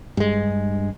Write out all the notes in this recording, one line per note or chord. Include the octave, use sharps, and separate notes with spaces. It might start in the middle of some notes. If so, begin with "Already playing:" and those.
G2 G#3